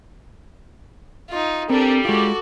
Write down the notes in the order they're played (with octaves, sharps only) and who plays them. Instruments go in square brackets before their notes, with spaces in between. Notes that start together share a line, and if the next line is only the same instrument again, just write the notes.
[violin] D#4 F4
[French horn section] G3 G4 [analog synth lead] C4 [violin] D4 A4 [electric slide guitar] A#4
[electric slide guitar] G#3 F4 [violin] F#4 A4 [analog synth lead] D6